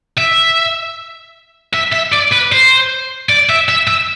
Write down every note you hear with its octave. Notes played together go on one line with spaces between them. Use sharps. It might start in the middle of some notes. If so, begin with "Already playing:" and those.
E5
E5
E5
D5
B4
C5
D5
E5
E5
E5